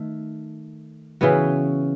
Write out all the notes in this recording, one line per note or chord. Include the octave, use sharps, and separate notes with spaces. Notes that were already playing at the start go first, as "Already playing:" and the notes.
Already playing: D#3 A3
C#3 E3 B3 F#4